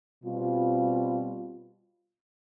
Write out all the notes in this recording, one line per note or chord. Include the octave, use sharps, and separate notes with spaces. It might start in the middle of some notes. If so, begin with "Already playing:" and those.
B2 G3 C4 F4